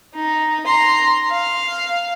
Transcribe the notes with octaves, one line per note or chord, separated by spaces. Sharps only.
D#4
A#5 C6
F5